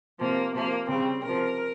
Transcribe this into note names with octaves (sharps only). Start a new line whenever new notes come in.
C3 F3 A#3
C3 F3 A#3
C#3 G3 C4
C3 F3 A#4